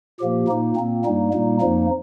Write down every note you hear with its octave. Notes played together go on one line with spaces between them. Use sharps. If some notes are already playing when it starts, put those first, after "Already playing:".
A#2 F3 A#3 G4
A#2 A#3 D#4
A#2 A#3 C4
G2 G3 A#3 D#4
A#2 G3 A#3
F2 F3 A#3 D#4